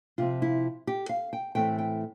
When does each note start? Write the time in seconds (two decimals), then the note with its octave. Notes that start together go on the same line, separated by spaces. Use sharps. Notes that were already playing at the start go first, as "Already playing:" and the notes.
0.18 C3 F3 C4 F4
0.42 E4
0.87 G4
1.09 F5
1.33 G5
1.55 A2 E3 A3 C4 G5
1.78 G5